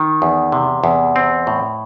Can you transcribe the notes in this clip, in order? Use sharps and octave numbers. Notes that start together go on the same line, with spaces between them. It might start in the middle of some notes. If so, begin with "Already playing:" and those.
Already playing: D#3
E2
C3
E2
C4
A2